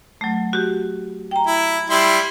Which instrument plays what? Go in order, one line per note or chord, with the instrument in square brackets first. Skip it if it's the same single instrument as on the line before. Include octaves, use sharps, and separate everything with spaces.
[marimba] F#3 A3
F#4 G4
G5 A#5
[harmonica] E4
G3 E4 C6